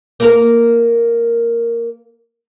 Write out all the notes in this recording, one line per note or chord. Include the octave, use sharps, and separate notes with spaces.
A#3 A#4